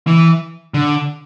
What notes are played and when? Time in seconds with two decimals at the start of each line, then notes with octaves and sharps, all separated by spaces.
0.07 E3
0.74 D3